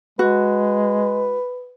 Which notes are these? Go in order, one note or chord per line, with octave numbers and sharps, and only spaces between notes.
G#3 F#4 B4